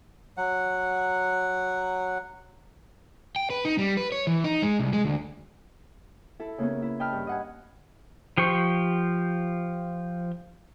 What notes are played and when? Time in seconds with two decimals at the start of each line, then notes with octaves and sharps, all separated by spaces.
0.37 F#3 F#5
3.36 G5
3.50 B4
3.65 D#4
3.79 G3
3.97 B4
4.12 C#5
4.27 E3
4.44 D#4
4.62 G#3
4.80 C2
4.93 G#3
5.05 D2
6.40 E4 A4
6.58 C#3 A#3 B3 C#4
6.82 E4
6.99 D#5 G5 A5 B5 F6
7.13 G2
7.27 D#5 F#5 G#5
8.38 F3 G4 C5 C#6